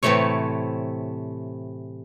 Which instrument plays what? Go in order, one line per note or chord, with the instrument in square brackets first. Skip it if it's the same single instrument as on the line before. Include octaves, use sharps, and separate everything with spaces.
[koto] A2 C3 E3 A3 E4 C#5